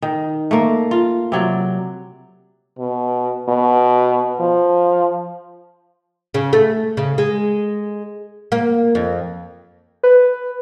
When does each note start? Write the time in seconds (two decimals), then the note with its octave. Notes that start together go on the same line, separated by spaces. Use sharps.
0.02 D#3
0.51 A3 A#3
0.91 F4
1.32 C3 F#3 D5
2.78 B2
3.48 B2
4.40 F3
6.34 C#3
6.53 A3
6.97 C#3
7.18 G#3
8.52 A#3
8.95 F2
10.03 B4